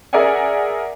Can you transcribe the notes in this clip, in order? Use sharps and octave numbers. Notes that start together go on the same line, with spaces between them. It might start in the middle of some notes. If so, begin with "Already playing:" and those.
G#4 A#4 D5 E5 F#5 G#5